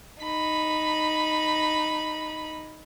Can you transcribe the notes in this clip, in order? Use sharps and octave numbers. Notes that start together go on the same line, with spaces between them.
D#4 B5